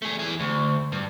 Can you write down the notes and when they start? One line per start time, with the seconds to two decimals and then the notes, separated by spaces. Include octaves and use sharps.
0.02 A3 G#4
0.19 E3 G#4
0.40 D2
0.92 G2